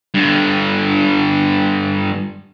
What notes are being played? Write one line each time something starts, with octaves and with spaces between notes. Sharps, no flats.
G2 D3